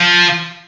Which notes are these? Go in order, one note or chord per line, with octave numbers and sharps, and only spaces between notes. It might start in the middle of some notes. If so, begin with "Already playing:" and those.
Already playing: F3